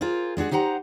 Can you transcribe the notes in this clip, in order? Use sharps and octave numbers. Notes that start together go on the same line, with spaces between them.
F4 G#4 A#4 C5
G#3 D4 F#4 G#4
D#4 G4 C5 F#5 A#5